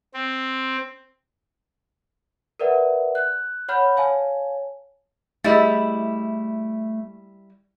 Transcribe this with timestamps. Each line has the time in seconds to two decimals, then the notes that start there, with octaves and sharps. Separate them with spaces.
0.14 C4
2.60 A#4 B4 D5 E5 F#5
3.15 F#6
3.69 C#5 F#5 B5 F6 G6
3.96 C#5 F5 G#5 A5
5.44 G3 A3 E4 G#4 D#5 A6